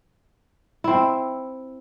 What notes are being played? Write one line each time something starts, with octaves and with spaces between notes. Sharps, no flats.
C4 E4